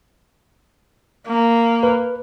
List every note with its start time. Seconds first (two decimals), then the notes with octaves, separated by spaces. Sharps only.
1.28 A#3
1.83 B4